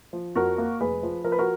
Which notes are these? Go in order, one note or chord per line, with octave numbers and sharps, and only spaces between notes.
F3
F2 F#4 A#4
A#3
F1 G#4 B4
F3
F3 A#4
B4
F#4 A#4